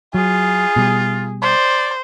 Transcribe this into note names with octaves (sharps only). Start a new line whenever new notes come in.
F#3 F4 G#4
B2 G3
C5 D5